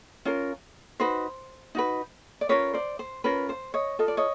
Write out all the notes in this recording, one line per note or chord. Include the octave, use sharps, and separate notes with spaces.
C#4 F4 A#4
D#4 F#4 B4 C5
D#4 F#4 B4
D5
C#4 F4 A#4 B4 C#5
C5 D5
C5
C#4 F4 A#4 B4
C5
C#5 D#5
F4 A4 D#5
D5
C#5 D#5